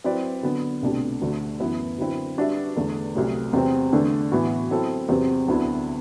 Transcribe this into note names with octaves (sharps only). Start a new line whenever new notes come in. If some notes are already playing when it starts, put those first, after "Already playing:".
F#3 C4 E4 B4 D5
D3 F#3 B3
C2 B2 A3 D4 G4
D2 D3 A3 D4 F#4
F#2 E3 B3 E4 B4
D3 F#3 C4 E4 B4
G3 D4 F#4 B4 E5
E2 D3 A3 D4
C2 C3 F#3 A3
E2 C3 F#3 C4
E2 D3 A3 D4
A2 E3 B3 F#4
F#3 C4 E4 A4
E2 C3 F#3 C4 G4
D2 D3 F#3 B3 E4